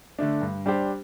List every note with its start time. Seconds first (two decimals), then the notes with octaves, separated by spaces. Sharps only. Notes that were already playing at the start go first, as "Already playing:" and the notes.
0.19 D3 A3 D4
0.42 G2
0.66 G3 D4 G4 C5